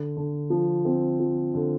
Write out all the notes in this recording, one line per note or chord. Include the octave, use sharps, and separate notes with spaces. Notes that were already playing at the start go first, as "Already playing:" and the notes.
Already playing: D3
D3
F3
C4
F3
D3